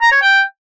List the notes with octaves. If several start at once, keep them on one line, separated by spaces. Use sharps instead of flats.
A#5
C#5
G5